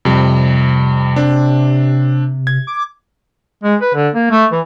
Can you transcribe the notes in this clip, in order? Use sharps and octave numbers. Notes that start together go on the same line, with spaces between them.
F2 C3 G3
C4 D4
G#6
D6
G#3
B4
D3
A#3
A3
E3